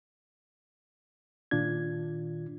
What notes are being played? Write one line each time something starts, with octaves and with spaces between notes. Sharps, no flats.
A#2 D#3 D4 F4 G#6